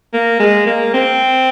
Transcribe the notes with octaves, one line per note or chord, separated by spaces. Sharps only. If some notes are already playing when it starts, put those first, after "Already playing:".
A#3
G#3
A#3
C4